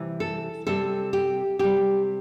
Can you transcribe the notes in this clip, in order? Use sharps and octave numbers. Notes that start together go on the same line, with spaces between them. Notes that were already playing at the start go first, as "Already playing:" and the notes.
Already playing: C3 E3 G3
A4
C3 G3 A4
G4
C3 G3 G4